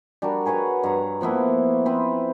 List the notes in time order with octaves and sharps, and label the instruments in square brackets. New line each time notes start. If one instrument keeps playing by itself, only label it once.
[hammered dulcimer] G3 D4 F#4 A#4
G#4 B4 C#5 F#5
G2 A#5
F3 A#3 B3 E4
C4 B4